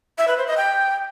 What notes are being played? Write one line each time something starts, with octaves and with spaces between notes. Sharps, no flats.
E5
B4
C5
D#5
G5